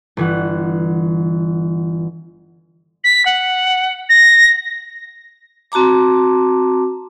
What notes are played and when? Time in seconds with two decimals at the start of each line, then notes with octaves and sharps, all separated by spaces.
0.17 G1 E3 F#5
3.04 B6
3.25 F#5
4.09 A#6
5.72 C4 F#4 A5 A#5 D6